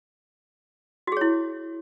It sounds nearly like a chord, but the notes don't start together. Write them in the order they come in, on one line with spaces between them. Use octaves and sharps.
F#4 G#4 C#5 E4